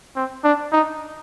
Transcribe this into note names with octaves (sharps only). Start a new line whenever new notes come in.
C4
D4
D#4